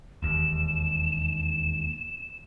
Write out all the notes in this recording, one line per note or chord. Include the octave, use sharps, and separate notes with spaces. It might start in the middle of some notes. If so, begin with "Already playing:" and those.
E1 D#2 E7